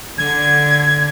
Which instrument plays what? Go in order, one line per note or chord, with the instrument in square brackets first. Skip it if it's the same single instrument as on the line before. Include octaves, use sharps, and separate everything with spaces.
[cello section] D3 [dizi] G#6